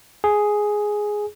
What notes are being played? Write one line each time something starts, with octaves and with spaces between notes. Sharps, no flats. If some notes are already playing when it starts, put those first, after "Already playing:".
G#4